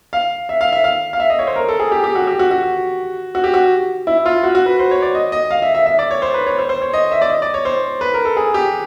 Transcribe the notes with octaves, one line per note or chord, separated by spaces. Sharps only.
F5
E5
F5
E5
F5
F5
E5
D#5
C#5
C5
A#4
A4
G#4
G4
G4
F#4
G4
F#4
F#4
F#4
G4
F#4
E4
F4
F#4
F#4
B4
C5
C#5
D5
D#5
D#5
F5
E5
E5
E5
D5
C#5
C5
B4
C#5
C5
C5
C#5
D#5
E5
D5
D#5
D5
C#5
C5
B4
A#4
A4
G#4
G4